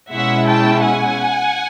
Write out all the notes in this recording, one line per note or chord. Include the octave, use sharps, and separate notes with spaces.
B2 G#3 C#4 E4 E5 F#5
G5 A5
F#5 G#5